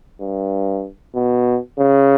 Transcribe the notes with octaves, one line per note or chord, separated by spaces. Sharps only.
G2
B2
C#3